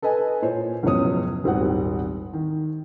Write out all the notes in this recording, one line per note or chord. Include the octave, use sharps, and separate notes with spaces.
A4 B4 D#5 G#5
A#2 C5 C#5
F#1 C#2 B2 F3 C#5 D#6
D#1 G#1 C4 F#5
D#3